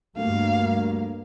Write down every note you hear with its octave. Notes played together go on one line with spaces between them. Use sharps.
D2 G2 A#3 F5